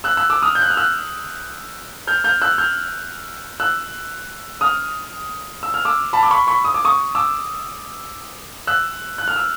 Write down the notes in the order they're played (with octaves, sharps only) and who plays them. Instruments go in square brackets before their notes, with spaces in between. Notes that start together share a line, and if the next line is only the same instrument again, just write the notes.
[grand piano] E6 F#6
E6 F#6
D6 E6
D#6 F6
G6
F#6
F6
E6 F#6
F6 G6
F6 G6
E6 F#6
F6 G6
E6 F#6
D#6 F6
E6
F6
D6 E6
A5 B5
D6
B5 C#6
B5 C#6
D#6
D6
C#6 D#6
D6 E6
E6 F#6
F#6
F6
E6